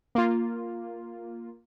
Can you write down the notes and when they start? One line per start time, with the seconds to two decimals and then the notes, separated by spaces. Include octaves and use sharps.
0.15 A#3 F4